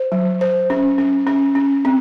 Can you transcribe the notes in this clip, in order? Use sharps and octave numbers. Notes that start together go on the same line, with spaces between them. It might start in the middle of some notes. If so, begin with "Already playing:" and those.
Already playing: C5
F#3
C5
C#4
C#4
C#4
C#4
C4